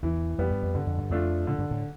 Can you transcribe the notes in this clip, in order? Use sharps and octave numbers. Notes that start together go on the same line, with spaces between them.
E2 E3
F2 G3 B3
G2
F2
G2 D3
F2
G2
F2 F3 A3 D4 F4
A2 D3
G2
A2